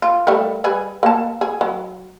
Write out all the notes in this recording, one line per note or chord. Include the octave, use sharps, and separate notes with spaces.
F4
G3 A3 A#4
G3 G#4 B4
A#3 A5
G#4
F#3